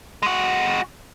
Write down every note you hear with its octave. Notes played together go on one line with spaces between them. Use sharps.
G#3 F#4